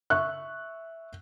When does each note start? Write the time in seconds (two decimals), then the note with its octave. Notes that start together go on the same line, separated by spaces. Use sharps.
0.10 E5 C#6 F#6